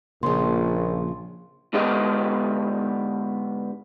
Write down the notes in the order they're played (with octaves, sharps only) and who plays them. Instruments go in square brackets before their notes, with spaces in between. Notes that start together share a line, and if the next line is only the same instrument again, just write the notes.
[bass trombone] A#1 [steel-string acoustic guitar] C#3 F3 [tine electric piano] A#3 G#4 [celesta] C6
[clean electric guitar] G#2 D3 B3 G4 D#5